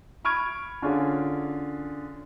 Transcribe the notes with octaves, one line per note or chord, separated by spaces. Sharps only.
B5 C#6 F6 G#6 D7
D3 C#4 D4 F4 G#4